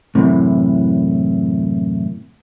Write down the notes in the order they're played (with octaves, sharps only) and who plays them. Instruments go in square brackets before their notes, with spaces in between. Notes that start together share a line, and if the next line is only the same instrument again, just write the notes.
[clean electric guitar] F#2 A2 C3 E3